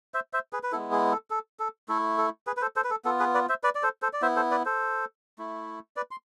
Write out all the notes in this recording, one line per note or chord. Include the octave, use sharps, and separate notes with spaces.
C5 E5
C5 E5
G#4 B4
B4
G#3 B3 E4 A4
G#4
A4
A4
A4
A3 E4 A4
A4
G#4 B4
B4
A4 C5
A4 C5
B4
A4
B3 F4 A4
G#4 B4
B4 D5
C5 E5
B4 D5
D5
A4 C5
A4 C5
D5
B3 E4 C5 E5
A4 C5
B4 D5
A4 C5
A3 E4
B4 D5
C6